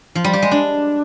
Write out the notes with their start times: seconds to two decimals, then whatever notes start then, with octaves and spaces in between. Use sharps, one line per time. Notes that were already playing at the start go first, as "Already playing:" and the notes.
0.15 F3
0.24 G3
0.33 G4
0.42 G#3
0.51 D4